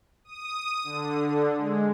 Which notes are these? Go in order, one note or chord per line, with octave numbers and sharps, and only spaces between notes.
D#6
D3
G#3